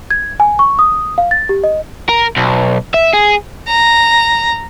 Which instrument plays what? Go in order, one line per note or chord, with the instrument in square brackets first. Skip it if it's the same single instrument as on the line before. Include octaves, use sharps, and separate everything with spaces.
[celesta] G#6
G#5
C#6
D#6
F5
A6
G4
D#5
[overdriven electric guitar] A#4
B1
E5
G#4
[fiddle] A#5